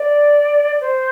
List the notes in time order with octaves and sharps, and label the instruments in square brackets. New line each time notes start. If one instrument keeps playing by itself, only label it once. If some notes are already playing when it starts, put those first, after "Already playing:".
Already playing: [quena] D5
C5